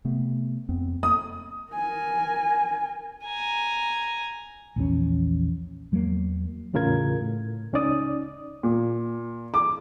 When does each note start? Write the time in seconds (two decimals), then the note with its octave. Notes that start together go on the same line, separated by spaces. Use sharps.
0.05 C3 A3 B3
0.69 F2 B3 C4
1.03 A#3 D#6
1.73 A#4 G#5
3.25 G#5 A#5
4.76 A#1 E2 C#3 C#4
5.92 E2 F#3 G3 A#3
6.73 E2 A2 C#3 F4 A#4 G#6
7.21 A2
7.73 C#2 C#4 D#4 D5 D#6
8.63 A#2
9.54 D6